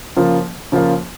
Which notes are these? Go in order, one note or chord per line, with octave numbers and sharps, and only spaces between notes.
C#3 F3 A#3 F4
C#3 F3 A#3 F4